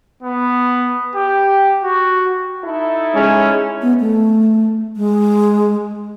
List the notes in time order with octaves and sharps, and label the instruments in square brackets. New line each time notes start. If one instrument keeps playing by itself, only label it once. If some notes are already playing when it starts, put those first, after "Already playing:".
[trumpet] B3
G4
F#4
[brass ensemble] D#4 E4 A4
[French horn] G#3 [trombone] C#4
[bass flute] B3
A3
G#3